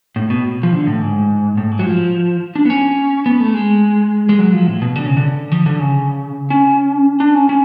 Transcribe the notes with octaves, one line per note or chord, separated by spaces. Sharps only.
A2
B2
F3
D3
A2
G#2
A2
G#2
F#3
F3
D4
B3
C#4
B3
A3
G#3
G#3
F#3
F3
A2
B2
D3
C#3
D3
F3
D3
C#3
C#4
D4
C#4
C#4